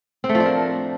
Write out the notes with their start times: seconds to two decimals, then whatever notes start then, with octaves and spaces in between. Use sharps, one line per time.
0.24 C4
0.29 A3
0.35 F3
0.40 D4
0.46 A#4